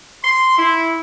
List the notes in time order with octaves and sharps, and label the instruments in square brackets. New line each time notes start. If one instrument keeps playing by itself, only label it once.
[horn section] C6
E4